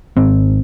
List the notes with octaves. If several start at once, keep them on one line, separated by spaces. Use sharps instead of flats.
G#1 C4